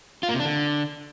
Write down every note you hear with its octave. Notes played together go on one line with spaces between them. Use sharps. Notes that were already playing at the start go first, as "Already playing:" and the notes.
F4
A#3
C3
D4
D3